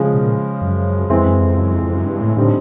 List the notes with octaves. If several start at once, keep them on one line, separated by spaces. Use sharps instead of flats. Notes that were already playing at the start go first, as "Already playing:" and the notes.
Already playing: C#3 F3 G#3
B2
A#2
F#2
F2 E3 G#3 C4 E4
F#2
F2
F#2
F2
F2
F#2
G2
A2
A2 D3 G3 C4 D#4